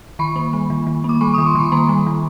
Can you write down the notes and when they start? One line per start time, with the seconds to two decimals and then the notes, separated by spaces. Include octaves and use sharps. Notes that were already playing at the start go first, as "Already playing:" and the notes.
0.19 D#3 B5 C#6
0.36 A#3
0.53 G3
0.70 D#3
0.87 D#3
1.04 A#3
1.09 D6
1.21 G3 B5 C#6
1.33 D#3 C#6 D#6
1.46 C6 D6
1.55 D#3 B5 C#6
1.72 A#3 A#5 C6
1.89 G3
2.07 D#3